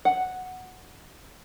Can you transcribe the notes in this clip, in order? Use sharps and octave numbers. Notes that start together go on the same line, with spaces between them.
F#5